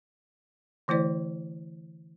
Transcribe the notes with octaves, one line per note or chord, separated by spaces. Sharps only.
D3 E3 A3 E4 C5 D5